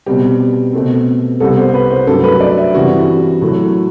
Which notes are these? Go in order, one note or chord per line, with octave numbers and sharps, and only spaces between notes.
B2 G3 C4 G4
B2 A3 C4
C2 C3 G3 B3 A4
C5
B4
C5
G2 F#3 A3 A4
B4
D5
E5
G2 E3 G3 C4 F#4
A2 F#3 A3